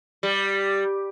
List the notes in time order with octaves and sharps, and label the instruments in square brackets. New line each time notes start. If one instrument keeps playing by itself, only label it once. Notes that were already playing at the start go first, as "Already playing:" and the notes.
[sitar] G3